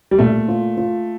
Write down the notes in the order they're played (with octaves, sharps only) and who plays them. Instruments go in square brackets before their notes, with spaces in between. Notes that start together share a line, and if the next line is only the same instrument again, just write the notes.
[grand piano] G3
[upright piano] A#2 [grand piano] A3
[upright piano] F4
F4